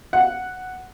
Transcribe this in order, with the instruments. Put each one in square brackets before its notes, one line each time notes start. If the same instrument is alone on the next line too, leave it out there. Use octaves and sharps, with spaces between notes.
[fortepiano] F#5